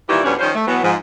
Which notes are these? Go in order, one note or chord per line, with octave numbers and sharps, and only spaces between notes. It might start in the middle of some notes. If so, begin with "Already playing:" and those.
A#2 D#3 E3 G3 E4 G4
F2 B2 G3 B3 C#4 D4
D#3 F3 G3 C#4 C5
A3
B2 E3 F#3 B3
G#2 F3